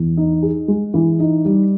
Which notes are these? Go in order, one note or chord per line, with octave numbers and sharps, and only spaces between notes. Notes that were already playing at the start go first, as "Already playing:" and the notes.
Already playing: E2
D#4
G#4
G#3
E3
D#4
G3